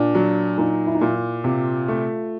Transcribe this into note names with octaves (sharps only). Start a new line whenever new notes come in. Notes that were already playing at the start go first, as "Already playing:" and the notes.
Already playing: A#2 D4
F#3
A#2 D#4
E4
D#4
A#2 E4
E4
C3 F4
A3